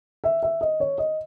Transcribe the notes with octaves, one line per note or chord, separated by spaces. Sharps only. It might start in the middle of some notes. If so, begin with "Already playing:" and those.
E5
E5
D#5
C#5
D#5